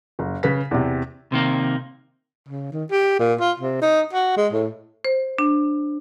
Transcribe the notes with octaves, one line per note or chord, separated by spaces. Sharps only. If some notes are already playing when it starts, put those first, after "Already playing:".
F#1
C#3 B4 B6
E2 C3
C3 D#3 A#3
C#3
D#3
G4
A#2
F4
C3
D#4
F#4
G#3
A2
C5
D4